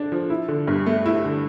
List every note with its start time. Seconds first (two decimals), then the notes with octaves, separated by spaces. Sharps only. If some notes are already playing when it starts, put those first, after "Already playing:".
Already playing: D3 D4
0.12 F3
0.30 E4
0.48 D3
0.68 G2
0.86 A3
1.06 E4
1.25 D3